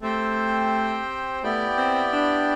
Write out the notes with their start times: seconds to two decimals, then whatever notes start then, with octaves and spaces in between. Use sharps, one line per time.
0.02 A3 C4 G4 C5 G5
1.43 A3 B3 E4 G4 D5 G5
1.78 C4
2.13 D4